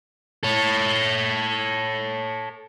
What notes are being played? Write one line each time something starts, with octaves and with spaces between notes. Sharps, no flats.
A4 C#5